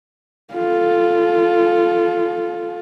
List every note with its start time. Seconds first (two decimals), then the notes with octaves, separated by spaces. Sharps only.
0.53 F4 A4